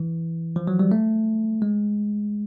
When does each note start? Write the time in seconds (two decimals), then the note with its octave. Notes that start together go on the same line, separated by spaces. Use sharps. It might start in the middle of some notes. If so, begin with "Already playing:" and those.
Already playing: E3
0.56 F3
0.67 F#3
0.79 G3
0.92 A3
1.62 G#3